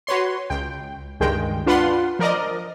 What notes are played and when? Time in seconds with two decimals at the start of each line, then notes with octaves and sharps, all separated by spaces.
0.07 F#4 B4 C#5 C6
0.50 C#2 G5
1.20 C#2 G2 D#3 G#3 G5
1.66 D4 F4 B4 F#5 C6
2.19 F3 A#4 D5 D#5